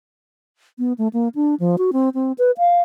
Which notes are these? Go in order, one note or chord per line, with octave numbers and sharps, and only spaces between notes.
B3
A3
A#3
D4
F3
F#4
C4
C4
B4
F5